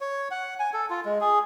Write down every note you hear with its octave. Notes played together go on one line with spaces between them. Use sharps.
C#5
F#5
G#5
A4
F4
G#3
G#4